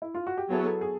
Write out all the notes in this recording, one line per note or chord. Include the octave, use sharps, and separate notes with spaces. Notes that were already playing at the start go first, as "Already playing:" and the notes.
E4
F4
F#4
G4
F#3 B3 E4 G#4 A4 C#5
A4
G#4